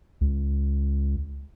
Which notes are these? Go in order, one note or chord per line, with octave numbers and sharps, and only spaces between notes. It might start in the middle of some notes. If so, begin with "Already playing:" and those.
C#2